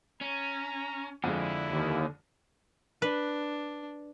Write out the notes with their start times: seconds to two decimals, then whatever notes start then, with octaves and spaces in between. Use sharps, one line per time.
0.21 C#4 A#5
1.24 F2 D3 G#3 E4
1.69 D#2
3.02 D4 B4